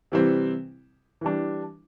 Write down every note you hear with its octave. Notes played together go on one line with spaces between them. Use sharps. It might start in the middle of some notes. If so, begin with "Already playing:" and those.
C3 E3 G3 C4
E3 G3 D4